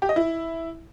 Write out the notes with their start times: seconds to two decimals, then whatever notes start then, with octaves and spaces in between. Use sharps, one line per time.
0.02 G4
0.09 D#5
0.16 E4